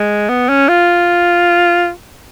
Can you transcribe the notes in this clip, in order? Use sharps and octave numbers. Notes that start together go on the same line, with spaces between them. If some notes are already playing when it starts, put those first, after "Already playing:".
Already playing: G#3
B3
C#4
F4